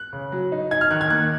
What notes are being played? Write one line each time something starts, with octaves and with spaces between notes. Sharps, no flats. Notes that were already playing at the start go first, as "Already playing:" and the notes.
Already playing: F#6
C#3
F#3
D#4
D#4 G#6
F6
D#3 F#6
G#6
A#3 F#6